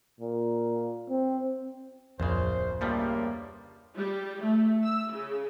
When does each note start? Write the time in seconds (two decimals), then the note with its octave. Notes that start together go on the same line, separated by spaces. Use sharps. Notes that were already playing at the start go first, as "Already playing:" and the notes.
0.20 A#2
1.10 C4
2.20 D1 A#1 F2 C#3 C5
2.81 G2 C#3 F3 G3 A3 A#3
3.97 G3
4.44 A3
4.84 E6
5.13 C#3